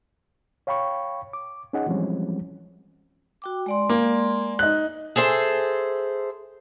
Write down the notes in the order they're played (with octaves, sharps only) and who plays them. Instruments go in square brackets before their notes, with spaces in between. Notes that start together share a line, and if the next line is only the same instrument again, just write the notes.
[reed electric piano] C#5 F5 G5 B5 C#6
D6
C#4 D#4 G#4 D#5 F#5
E3 F3 G3 G#3 C4 C#4
[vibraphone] F#4 G5 D6
G#3 D5 C6
[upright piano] A#3
D#4 F#6
[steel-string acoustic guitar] G#4 A4 C5 E5